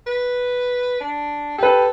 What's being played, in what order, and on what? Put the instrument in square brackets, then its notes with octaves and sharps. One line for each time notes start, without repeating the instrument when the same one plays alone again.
[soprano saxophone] B4
D4
[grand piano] G4 B4 [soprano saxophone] A4